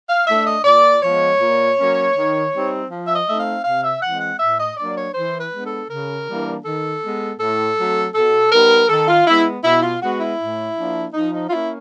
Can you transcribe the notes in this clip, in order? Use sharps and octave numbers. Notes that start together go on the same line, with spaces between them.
F5
A3 D4 E5
D#5
A#2 D5
F3 G#3 B3 C#5
A#2
F#3 A#3 C#4
D#3
G3 C4 D#4
F3
E5
D#5
A3 C4 D#4 E5
F5
C3 F5
E5
E3 G#3 C4 F#5
F#5
A2 E5
D#5
F#3 A#3 D4 D5
C#5
E3 C5
B4
G#3 B3 D4
A4
C#3 A#4
E3 G3 A#3 D4
D#3 A4
G#3 B3
A2 A4
F#3 A3 C4
B2 A4
G3 B3 D#4 A#4
D#3 A4
F4
G#3 B3 E4
B2 E4
F4
G#3 B3 F#4
E4
A2
F3 A#3 D4
F3 D#4
D#4
F4
A#3 C#4 E4